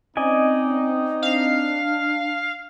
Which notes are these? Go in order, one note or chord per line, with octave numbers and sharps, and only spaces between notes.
C4 C#4 D#4 D5 D#5 G#5
D4 F5